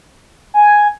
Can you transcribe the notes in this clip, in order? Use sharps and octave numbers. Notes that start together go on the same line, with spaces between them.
G#5